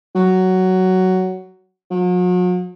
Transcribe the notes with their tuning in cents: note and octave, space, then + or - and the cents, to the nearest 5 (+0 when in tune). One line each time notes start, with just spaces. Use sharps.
F#3 +10
F#3 -45